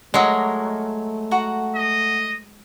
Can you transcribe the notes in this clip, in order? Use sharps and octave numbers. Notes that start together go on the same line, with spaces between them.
F#3 G#3 A3 F#4 A#4 D#5
F#4 F#5 A#5
D#5